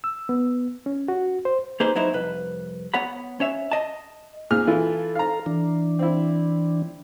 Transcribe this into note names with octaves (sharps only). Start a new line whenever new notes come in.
E6
B3
C#4
F#4
C5
A#3 D#4 G#4 B4 C5
F#3 B3 D#4 E4 C5
C2 F2 B4
B3 C#5 F#5 B5
C#4 C#5 E5
D#5 A5
A#2 G#4 F6
E3 E4 F4 A4
F5 A#5
E3 D4
C4 E4